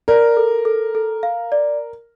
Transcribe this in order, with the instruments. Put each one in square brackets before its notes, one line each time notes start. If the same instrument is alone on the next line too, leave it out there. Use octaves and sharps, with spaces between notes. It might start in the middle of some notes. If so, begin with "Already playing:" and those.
[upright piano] A#4 [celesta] D5
[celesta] A4
A4
A4
F5
D5